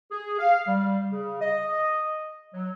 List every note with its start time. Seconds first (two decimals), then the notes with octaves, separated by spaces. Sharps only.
0.11 G#4
0.39 F5
0.67 G3
1.11 C#3
1.41 D#5
2.54 F#3